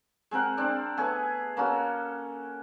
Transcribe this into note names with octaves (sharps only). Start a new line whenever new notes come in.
G#3 C4 A#4 F#5
C4 D4 D5
A3 B3 G#4 C#5
A#3 C#4 F#4 A4